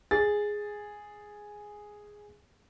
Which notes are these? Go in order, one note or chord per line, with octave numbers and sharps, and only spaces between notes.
G#4 A6